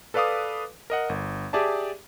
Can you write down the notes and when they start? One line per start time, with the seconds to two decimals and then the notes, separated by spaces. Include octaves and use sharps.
0.14 A4 B4 D5 F5 D6 D#6
0.90 A#4 D#5 F#5
1.09 G1
1.53 G4 G#4 D5 E5 A5